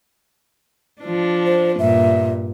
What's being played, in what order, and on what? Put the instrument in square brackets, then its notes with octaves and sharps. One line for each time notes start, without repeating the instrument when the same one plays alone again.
[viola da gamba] F3 D4
[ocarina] C5
[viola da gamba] G2 A#2 [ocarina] E5